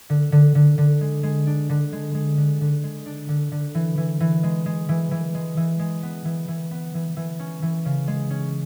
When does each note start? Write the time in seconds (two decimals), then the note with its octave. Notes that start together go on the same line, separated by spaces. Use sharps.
0.09 D3
0.32 D3
0.55 D3
0.78 D3
1.01 G#3
1.23 G#3
1.47 D4
1.69 D3
1.92 G#3
2.14 G#3
2.37 D3
2.61 D3
2.83 G#3
3.06 D4
3.28 D3
3.52 D3
3.75 E3
3.97 E3
4.20 E3
4.43 G#3
4.66 G#3
4.89 E3
5.11 E3
5.35 G#3
5.57 E3
5.79 G#3
6.03 B3
6.25 E3
6.48 E3
6.71 B3
6.94 E3
7.17 E3
7.39 C#4
7.62 E3
7.85 C#3
8.08 G#3
8.30 C#4